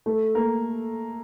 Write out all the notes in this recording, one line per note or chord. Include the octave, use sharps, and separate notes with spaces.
A3 A4
A#3 A#4